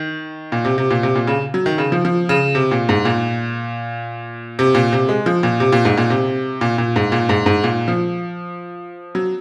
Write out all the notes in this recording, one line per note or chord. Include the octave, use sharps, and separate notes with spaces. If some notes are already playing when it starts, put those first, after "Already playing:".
Already playing: D#3
A#2
C3
C3
A#2
C3
A#2
C#3
F#3
D#3
C#3
F3
F3
C#3
C3
A#2
G#2
A#2
C3
A#2
C3
G#3
F3
A#2
C3
A#2
G#2
A#2
C3
A#2
A#2
G#2
A#2
G#2
G#2
A#2
F3
F#3